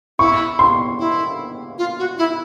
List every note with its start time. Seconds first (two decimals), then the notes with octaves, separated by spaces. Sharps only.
0.19 E4 C#6
0.59 C6
0.99 E4
1.78 F4
1.99 F#4
2.18 E4